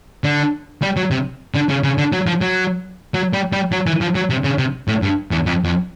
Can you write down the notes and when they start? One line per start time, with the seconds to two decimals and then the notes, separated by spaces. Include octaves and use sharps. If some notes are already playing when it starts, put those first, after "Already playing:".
0.24 D3
0.82 G3
0.97 F#3
1.11 C3
1.54 D3
1.69 C#3
1.84 C#3
1.98 D3
2.12 F#3
2.27 F3
2.41 F#3
3.14 F#3
3.33 G3
3.53 G3
3.72 F#3
3.87 E3
4.01 F3
4.15 F#3
4.30 C3
4.44 C#3
4.58 C3
4.88 A2
5.02 G2
5.31 E2
5.46 F2
5.65 F2